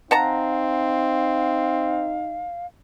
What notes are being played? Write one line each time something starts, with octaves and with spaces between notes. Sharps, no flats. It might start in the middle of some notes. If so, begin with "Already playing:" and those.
C4 D#4 F5 F#5 A5 A#5